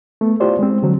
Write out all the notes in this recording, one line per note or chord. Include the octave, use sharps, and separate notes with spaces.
A3 B3
E4 F4 G4 C5 D5
G#3 C4
D3 F3 F#3 C4